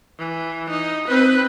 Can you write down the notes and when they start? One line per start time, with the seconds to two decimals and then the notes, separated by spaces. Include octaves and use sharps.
0.19 E3
0.70 D#4
1.08 C4 B4